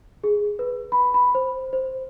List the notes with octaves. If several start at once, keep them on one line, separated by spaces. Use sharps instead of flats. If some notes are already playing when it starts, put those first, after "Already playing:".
G#4
B4
B5
B5
C5
C5